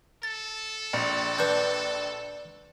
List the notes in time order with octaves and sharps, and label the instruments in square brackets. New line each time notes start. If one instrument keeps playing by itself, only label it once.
[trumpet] A4 [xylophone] A6
[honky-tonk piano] A#1
[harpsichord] D4 A5 [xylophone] B4 G6